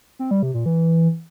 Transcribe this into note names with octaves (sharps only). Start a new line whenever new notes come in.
C4
G3
C3
A#2
E3